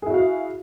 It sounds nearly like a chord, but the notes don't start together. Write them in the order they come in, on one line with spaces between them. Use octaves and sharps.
G#4 E4 F#4 F5